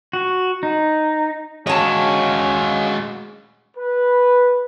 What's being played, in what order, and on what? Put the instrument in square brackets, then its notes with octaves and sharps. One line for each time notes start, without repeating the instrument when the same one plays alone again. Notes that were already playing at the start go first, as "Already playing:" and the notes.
[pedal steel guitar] F#4
D#4
[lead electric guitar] G#3 F#4 [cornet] C#4 [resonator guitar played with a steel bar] C#5 A5 [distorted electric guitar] D#5 F5
[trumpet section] B4